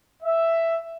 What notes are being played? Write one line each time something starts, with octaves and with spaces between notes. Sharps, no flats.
E5